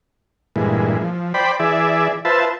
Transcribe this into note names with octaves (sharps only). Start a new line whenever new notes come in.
G2 A#2 E3 G#3
F3
C5 D5 G5 B5
E3 G#4 D5 E5
F4 B4 C5 E5 A5